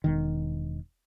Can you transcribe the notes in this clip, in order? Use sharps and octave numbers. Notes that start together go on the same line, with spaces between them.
E1 D#3